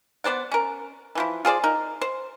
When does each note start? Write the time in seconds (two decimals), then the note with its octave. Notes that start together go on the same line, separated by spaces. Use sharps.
0.24 B3 C5 D5 F#5
0.52 C#4 A#4
1.15 E3 F3 E4
1.45 F4 G#4 C5 D5
1.64 D#4 A#4
2.01 C5